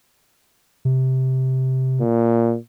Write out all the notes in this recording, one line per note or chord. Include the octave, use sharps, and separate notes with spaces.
C3
A#2